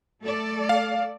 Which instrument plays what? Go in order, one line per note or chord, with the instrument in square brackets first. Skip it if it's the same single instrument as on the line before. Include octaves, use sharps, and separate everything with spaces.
[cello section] A3 A4 D5
[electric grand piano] F5